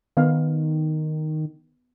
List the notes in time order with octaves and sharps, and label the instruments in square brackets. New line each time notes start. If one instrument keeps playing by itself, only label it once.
[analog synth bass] D#3 [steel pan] B3 F5